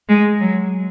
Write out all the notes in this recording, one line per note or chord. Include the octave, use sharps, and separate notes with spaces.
G#3
F#3